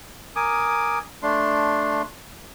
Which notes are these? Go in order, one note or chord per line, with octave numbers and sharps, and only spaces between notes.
A#4 G#5 D6 D#6
A3 D4 C6